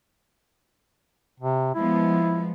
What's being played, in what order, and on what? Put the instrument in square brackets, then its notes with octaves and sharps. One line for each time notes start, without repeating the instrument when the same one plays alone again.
[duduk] C3
[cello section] F3 G#3 B3 [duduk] E4